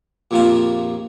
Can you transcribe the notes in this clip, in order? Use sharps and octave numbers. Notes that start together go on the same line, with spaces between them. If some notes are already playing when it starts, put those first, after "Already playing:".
A#1 F2 C3 F3 A#3 A5